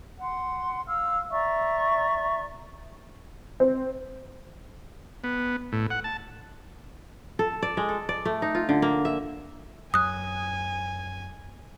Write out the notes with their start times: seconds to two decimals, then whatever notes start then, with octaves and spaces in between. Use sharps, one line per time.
0.19 F#5 C6
0.86 F5 E6 F6
1.29 D5 E5 A#5 C#6
3.60 C4
5.24 B3
5.72 A2
5.90 F#5
6.04 A5
7.39 A4
7.62 D5
7.77 G#3
7.89 A4
8.09 D5
8.25 A3
8.42 D#4
8.55 F4
8.69 D3
8.82 A#3
9.05 E5
9.94 F#2 G#5 D#6 F#6